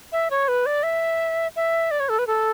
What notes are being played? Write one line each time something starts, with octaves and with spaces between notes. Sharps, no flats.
E5
C#5
B4
D5
E5
E5
D5
C#5
A4
B4
A4